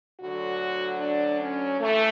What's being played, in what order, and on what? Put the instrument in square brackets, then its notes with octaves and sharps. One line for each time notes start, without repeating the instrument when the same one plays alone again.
[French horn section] D2 D3 F#3 F#4
D4
C#4
E3 A3